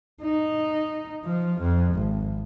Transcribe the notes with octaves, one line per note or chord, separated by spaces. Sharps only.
D#4
F3
F2
G#1